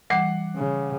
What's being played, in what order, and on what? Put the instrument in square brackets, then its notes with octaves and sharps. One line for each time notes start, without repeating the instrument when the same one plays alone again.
[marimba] E3 G3 [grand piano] F#5 D6 C7
[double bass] C#3